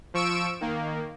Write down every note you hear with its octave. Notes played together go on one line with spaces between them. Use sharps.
F3 C#6 E6 D7 E7
D#3 A#3